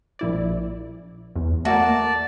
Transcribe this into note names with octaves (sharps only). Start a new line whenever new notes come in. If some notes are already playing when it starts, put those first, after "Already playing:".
A#1 E4 D5
E2
A3 A#3 F#4 D5 A5